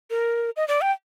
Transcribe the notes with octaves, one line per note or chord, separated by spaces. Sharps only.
A#4
D#5
D5
G5